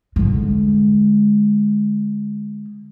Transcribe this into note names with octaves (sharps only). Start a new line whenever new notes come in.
D3 G#3